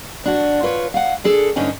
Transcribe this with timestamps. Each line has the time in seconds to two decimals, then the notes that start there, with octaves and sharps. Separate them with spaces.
0.24 F3 D4 F#4
0.63 F4 B4 C#5
0.94 F5 F#5
1.24 D4 G#4 A4
1.56 D2 G2 D3 C#4 D#4 G#5